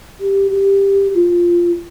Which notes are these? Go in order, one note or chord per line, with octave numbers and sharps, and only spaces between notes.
G4
G4
F4